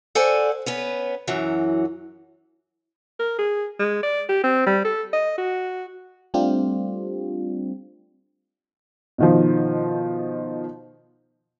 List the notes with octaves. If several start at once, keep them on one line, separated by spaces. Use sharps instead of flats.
A4 C5 D5 F#5 G#5
B3 C#4 B4
F#2 E3 F#3
A#4
G#4
G#3
D5
G4
C4
G3
A4
D#5
F#4
G3 A3 C4 D4 F4 G4
B2 D#3 F3